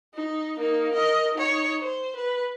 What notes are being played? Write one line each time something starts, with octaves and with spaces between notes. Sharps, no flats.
D#4
A#3 D#4
A#4 D#5
D#4 C#5
C5
B4